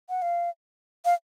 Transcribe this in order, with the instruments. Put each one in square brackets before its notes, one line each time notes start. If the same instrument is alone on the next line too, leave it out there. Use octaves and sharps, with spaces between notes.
[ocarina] F#5
F5
F5